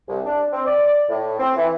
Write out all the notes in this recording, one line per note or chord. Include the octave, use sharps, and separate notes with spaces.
C2
D4
C4
D5
A2
C4
E3